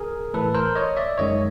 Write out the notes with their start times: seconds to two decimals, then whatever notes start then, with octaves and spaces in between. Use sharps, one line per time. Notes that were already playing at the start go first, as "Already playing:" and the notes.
Already playing: G#4 A#4
0.34 A2 E3 A3 A4 B4
0.54 A#4 C5
0.76 C#5 D#5
0.97 D5 E5
1.18 F#2 D#3 G#3 C#5 D#5